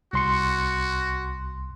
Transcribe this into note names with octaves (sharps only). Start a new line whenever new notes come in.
C2 F#4 C6 C#7